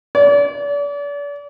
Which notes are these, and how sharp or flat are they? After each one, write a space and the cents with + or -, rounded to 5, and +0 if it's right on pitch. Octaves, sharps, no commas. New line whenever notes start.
D5 -40